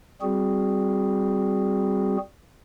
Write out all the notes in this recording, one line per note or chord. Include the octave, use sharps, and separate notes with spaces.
G3 C4 F#4 G#4